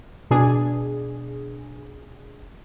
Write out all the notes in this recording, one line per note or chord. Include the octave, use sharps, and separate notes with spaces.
B2 D4 G#4